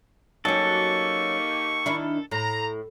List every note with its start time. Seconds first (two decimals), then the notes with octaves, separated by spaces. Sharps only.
0.45 F#3 A#3 C#4 D#4 G4 A4 C#6
1.86 D#3 D4 E4
2.31 A2 A#5